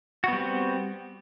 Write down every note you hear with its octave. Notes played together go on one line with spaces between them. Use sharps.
G3 B3 C4 F#4